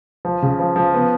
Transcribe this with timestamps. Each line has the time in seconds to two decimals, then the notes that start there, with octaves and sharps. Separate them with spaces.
0.25 F3
0.42 C#3
0.60 F3
0.76 F3
0.94 B3